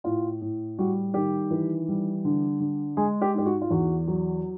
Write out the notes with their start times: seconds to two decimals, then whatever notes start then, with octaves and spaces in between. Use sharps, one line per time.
0.04 A2 F4
0.41 A2
0.78 G3 F#4
1.14 D#3 G4
1.50 E3
1.88 G3
2.25 D3
2.60 D3
2.97 G#3 G#4
3.21 G4
3.34 G#2 G4
3.46 F#4
3.61 F4
3.70 E2 F#4
4.08 F#3